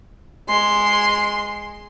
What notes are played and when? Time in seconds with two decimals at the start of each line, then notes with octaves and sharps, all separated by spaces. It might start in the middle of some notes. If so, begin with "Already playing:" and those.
0.49 G#3 C6